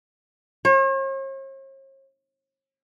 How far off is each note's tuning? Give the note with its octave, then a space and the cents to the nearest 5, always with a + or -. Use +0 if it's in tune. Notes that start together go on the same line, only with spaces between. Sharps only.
C#5 -45